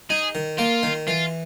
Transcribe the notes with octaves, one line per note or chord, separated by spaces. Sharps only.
D#4 G#4
D#3
A#3 F4
D#3
E3 F4